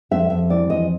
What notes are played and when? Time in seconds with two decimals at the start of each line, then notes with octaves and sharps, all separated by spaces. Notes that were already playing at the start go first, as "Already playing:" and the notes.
0.11 F2 E5
0.30 F2 E5
0.50 E3 D5
0.69 F2 D#5